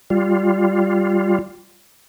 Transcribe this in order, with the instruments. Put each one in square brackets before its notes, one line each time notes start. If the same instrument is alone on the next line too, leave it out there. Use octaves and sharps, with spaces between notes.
[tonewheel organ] G3 F4